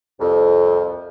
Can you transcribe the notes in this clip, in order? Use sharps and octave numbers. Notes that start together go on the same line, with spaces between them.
C2 F2